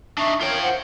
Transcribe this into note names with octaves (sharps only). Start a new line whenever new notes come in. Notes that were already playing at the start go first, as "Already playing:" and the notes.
D4 D#4 E5 C#6
F4 A#4 C#5 G5
C5 F#5